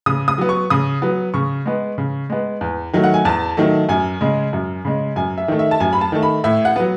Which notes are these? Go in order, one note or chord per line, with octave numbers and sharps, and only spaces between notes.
C#3 D#6
D#6
F#3 B3
C#6
C#3 D#6
F#3 B3
C#3 C#6
G#3 B3
C#3
G#3 B3
E2
D#3 F#3 A3
F#5
G#5
E2 A5
D#3 F#3 A3
F#2 G#5
C#3 G#3
F#2
C#3 G#3
F#2 G#5
E5
D#3 A3
E5
A5
F#2 G#5
B5
A5
D#3 A3
B5
A2 E5
F#5
F#3 B3